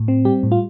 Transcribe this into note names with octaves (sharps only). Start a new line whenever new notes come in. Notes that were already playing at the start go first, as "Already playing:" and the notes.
Already playing: A2
C4
G3 G4
A2
F4